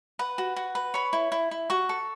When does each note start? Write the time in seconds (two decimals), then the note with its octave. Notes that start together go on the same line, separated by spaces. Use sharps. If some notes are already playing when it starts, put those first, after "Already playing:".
0.19 B4 F#5
0.38 F#4
0.56 F#4
0.75 B4
0.94 C#5 B5
1.13 E4
1.32 E4
1.51 E4
1.70 F#4 C#6
1.89 A4